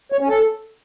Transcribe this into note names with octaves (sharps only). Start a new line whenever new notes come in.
C#5
C#4
A4